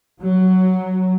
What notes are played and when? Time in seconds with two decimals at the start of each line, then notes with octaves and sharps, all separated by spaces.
0.21 F#3